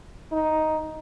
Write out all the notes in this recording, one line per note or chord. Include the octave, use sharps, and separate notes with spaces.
D#4